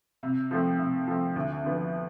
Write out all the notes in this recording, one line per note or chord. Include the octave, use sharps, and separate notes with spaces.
C3
F3 A3 C4
C3
F3 A3 C4
D2
D3 F3 B3